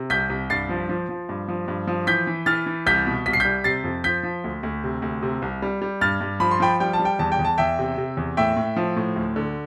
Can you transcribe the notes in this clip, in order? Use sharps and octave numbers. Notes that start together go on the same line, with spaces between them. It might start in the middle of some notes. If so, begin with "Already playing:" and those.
Already playing: C3
C2 G6 B6
C2
G2 A6 C7
F3
F3
F3
G2
F3
G2
F3
E3 G6 B6
E3
E3 F6 A6
E3
C2 G6 B6
B2
C2 B6
C7
G3 G6 B6
C3 A6 C7
F2
F3 G6 B6
F3
D2
D2
C3
D2
C3
C2
G3
G3
G2 F6 A6
G2
F3 B5
C6
F3 G5 B5
G3 G5
A5
G3
G5
E2 A5
G5
E2
A5
E2 E5 G5
C3
C3
E2
A2 E5 G5
A2
F3
A2
D2
D3